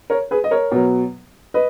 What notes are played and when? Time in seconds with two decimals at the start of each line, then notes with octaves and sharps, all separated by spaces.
0.10 A#4 C#5
0.31 G#4 B4
0.44 D#5
0.51 A#4 C#5
0.71 B2 F#3
1.54 B4 D#5